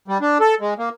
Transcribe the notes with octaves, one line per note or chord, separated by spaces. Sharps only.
G3
D4
A4
G#3
A#3